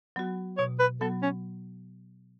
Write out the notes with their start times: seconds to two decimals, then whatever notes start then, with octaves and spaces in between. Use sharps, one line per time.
0.16 F#3 B3 F#4
0.58 B2 C#5
0.79 B4
1.01 F#3 B3 F#4 A4
1.23 C#4